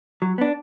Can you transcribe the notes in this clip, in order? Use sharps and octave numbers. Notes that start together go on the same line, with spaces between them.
F#3
B3 D4